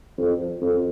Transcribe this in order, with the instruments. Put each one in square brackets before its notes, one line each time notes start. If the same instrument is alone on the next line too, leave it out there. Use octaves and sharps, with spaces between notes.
[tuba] F2
F2